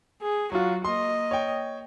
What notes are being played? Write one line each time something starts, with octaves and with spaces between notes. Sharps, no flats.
G#4
F#3 F4 F#4
A#3 D#5 C6
C#5 G5